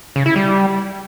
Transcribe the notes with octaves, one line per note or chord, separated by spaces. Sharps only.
C#3
E4
G3